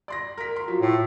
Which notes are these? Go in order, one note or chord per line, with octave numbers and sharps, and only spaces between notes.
D5 C6 A#6
A#4 B6
A#4 C6
F3 F#3
A2